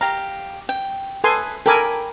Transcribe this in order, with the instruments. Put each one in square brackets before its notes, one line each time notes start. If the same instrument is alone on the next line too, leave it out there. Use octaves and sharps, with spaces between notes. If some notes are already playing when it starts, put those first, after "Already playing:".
[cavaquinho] G4 F5 [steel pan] A#5
[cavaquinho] G5
[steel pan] A4 G#5 C6 [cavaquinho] B4 D#6
[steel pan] A4 A#4 G#5 [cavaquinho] G5 B5 D6